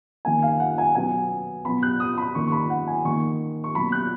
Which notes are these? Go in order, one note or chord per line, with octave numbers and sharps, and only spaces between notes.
D#3 A#3 G#5
F5
F#5
G#5
B2 F#3 B3 G#5
B2 F#3 B3 B5
F#6
D#6
B5
D#3 A#3 C#6
C#6
B5
F#5
G#5
D#3 A#3 C#6
C#6
B2 F#3 A#3 B5
F#6